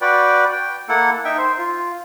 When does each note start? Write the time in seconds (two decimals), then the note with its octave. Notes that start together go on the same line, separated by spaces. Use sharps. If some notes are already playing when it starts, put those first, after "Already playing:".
0.01 F#4 B4 D5 G5
0.53 G5
0.89 A#3 E4 A4 F#5
1.25 D#4 E5 G5
1.38 C5
1.58 F4